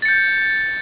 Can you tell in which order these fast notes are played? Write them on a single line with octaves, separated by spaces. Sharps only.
A6 C#7 G6